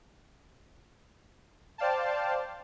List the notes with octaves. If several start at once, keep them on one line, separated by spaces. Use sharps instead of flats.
C5 D5 F5 G5 A5